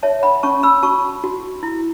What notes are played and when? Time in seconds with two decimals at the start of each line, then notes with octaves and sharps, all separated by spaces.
0.03 C#5 E5 A5
0.23 F#5 B5
0.43 C#4 A5 C#6
0.63 B5 E6
0.83 F#4 A5 C#6
1.24 F#4
1.63 E4